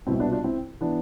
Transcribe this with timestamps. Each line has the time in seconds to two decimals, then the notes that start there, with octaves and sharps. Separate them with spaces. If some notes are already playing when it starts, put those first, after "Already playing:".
0.07 B2 C4 E4
0.11 C2
0.20 B3 D4
0.32 D4 F4
0.44 C4 E4
0.81 E3 B3 D4